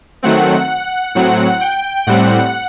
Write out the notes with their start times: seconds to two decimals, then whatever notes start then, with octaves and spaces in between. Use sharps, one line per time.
0.23 D#3 F#3 A3 C4 F#5
1.15 A2 F#3 C4 F#5
1.61 G5
2.07 A2 G3 C4 F#5